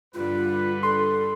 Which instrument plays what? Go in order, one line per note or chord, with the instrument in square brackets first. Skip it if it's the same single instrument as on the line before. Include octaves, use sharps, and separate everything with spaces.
[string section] G2 D3 G3 [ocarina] F4 [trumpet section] B4
[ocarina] A4 [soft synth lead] C6